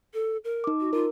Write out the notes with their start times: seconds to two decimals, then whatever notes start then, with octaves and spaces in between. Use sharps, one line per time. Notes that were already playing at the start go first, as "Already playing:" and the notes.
0.14 A4
0.44 A#4
0.64 D#4 D6
0.80 F#4
0.93 F4 A#4